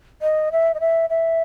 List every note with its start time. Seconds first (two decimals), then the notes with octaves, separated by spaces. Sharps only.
0.22 D#5
0.52 E5
0.74 D#5
0.80 E5
1.10 E5